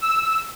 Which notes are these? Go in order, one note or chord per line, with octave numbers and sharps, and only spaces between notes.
E6